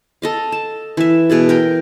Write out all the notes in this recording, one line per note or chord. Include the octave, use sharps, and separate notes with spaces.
A4 D#5 F5
A5
E3 E5
B2 G#4 A4
A#4 G5